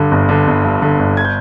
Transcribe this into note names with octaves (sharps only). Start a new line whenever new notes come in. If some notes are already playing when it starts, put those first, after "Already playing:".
Already playing: G2 D3
G1
D3
G1
G2
D3
G1
G#6
G6